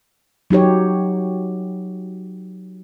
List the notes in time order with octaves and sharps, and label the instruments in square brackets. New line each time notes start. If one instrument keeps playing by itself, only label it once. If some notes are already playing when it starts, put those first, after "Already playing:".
[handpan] F#3 D#4 G4 C#5